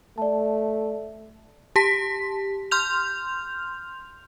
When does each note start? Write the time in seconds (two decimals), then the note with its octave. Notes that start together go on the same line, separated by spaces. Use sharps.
0.18 A3 D5 A5
1.76 G4 A5 B6
2.71 C6 F6 G6 F7